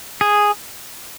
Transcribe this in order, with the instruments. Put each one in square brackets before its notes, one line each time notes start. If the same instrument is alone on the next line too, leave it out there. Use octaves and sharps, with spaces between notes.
[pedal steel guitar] G#4